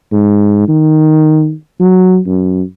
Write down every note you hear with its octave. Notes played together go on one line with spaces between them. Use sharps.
G#2
D#3
F#3
F#2